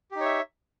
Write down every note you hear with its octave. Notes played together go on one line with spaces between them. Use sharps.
D#4 G4 C#5 E5